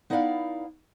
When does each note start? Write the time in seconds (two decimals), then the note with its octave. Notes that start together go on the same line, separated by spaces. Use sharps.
0.10 B3 D#4 E4 D5 F5 F#5